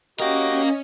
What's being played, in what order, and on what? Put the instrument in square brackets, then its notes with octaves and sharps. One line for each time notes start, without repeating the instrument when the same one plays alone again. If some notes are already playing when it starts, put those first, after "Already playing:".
[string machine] C#4 [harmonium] F#4 G4 G5 [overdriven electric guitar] A#4 F5 [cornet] D#5